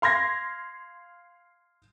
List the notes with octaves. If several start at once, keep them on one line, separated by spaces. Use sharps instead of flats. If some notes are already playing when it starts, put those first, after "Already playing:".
F5 C6 G#6 A#6